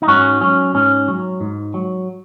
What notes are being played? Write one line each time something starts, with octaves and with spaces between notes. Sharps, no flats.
D#4
G#2 C#4 F#4
F#3 C#4
G#2 C#4
F#3
G#2
F#3